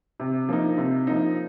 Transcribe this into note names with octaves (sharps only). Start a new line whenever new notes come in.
C3
F3 A#3 D#4
C3
F3 A#3 D#4